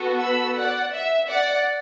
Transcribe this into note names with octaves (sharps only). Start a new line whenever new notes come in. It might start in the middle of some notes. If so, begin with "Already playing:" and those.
Already playing: B3 F#4 A4
B5 E6
D5 F#5
E5
D5 F#5